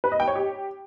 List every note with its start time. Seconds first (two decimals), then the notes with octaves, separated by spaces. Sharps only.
0.04 B4
0.12 D#5
0.20 G5
0.28 C#5
0.36 G4